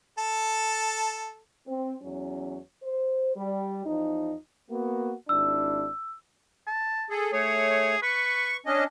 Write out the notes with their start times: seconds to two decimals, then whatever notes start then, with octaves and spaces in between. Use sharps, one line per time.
0.18 A4 A5
1.68 C4
2.02 E2 F#3 C#4
2.83 C5
3.36 G3
3.86 E2 F3 D#4
4.70 A#3 B3 F#4
5.29 G#1 D4 E4 E6
6.67 A5
7.10 G#4 A4
7.33 A3 G#4 C#5
8.02 B4 C#6
8.66 C#4 D4 D#5